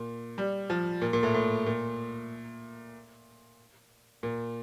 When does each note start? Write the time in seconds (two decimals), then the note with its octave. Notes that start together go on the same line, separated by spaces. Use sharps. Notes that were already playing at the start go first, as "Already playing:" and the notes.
Already playing: A#2
0.38 G3
0.70 F3
1.02 A#2
1.13 A#2
1.23 A2
1.34 A2
1.66 A#2
4.23 A#2